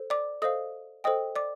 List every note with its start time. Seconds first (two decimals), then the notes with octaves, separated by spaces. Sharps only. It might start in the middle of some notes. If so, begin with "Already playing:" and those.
Already playing: A4 C5
0.10 D5 D6
0.42 A4 C5 D#5 F5 D#6
1.04 A4 C5 D#5 G5 D#6
1.36 D5 D6